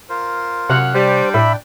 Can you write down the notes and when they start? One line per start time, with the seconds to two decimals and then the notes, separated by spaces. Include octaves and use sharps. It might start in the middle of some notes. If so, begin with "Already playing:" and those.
0.09 F4 A#4 C5
0.70 F#2 C3 F5 F#5
0.95 G3 D4 C5 D5 G5
1.34 A2 E5 B5